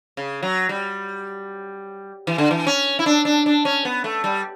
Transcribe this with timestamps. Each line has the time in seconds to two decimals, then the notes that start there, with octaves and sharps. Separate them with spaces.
0.17 C#3
0.43 F#3
0.69 G3
2.27 E3
2.38 D3
2.51 E3
2.67 C#4
2.99 E4
3.06 D4
3.25 D4
3.46 D4
3.65 C#4
3.85 B3
4.04 A3
4.24 G3